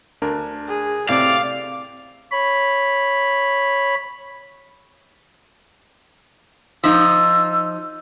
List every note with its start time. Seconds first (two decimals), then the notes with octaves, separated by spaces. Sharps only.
0.22 D2 D4 A#4
0.68 G#4
1.09 A2 C3 C4 D5 F5 D6
2.32 C#5 B5
6.84 F3 D#4 E6